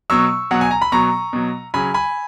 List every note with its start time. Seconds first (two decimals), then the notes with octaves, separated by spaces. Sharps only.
0.10 B2 F#3 C#6 E6
0.51 B2 F#3 F#5
0.61 G#5
0.71 A#5
0.82 B5
0.92 B2 F#3 A#5 C#6
1.33 B2 F#3
1.74 C#3 F#3 G#5 B5
1.94 G#5 B5